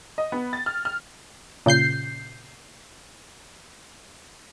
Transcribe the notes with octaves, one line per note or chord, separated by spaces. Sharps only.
D#5
B3
A6
F6
F6
A#2 C#3 G6 C7